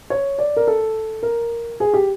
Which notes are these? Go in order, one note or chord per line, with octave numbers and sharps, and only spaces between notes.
C#5
D5
A#4
A4
A#4
G#4
G4